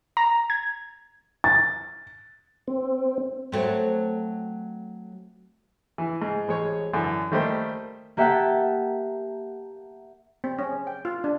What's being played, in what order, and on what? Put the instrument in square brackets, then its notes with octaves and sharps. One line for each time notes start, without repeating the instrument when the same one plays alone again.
[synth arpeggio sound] A#5
G#6
[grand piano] A6
[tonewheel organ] C4
[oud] F#3 A3 C4
[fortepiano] E3
G#2
A1 G#3 C5 C#5
F#2 D3 E3
D#3 G3 A3 A#3 G4 C5
[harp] A#3 G4 E5 F#5 G5 A5
[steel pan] C4
C#4
G5
F4
D4